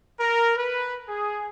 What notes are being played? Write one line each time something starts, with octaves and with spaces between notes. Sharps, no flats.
A#4
B4
G#4